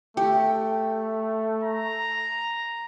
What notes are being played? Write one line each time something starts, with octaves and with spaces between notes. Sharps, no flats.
A3 G4
A#5